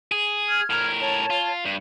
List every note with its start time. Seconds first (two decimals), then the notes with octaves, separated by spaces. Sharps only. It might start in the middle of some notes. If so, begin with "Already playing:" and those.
0.12 G#4
0.48 F6 G#6
0.70 A2 A#4
1.00 C#5 A5
1.30 F4
1.65 G2